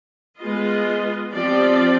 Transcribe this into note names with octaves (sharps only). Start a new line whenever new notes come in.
G#3 B3 F4 B4 D#5
F3 C4 G4 D5